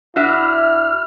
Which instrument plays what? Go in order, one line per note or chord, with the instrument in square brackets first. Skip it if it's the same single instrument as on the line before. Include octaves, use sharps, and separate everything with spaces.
[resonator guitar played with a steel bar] D4 F#4 E5 [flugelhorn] E4 [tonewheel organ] F6